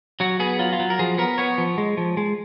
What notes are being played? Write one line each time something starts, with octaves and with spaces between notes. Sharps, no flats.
F#3 F#4
B3 G#4
F#3 F4
F4
F#3
A#4
F3 G#4
B3 A#4
B3 C#5
F3
G#3
F3
G#3